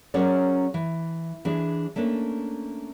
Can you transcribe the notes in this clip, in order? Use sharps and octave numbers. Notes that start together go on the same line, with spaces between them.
F#3 C#4 G#4 A#4 C#5 D5
E3
E3 D4 G#4
A3 A#3 C#4 D4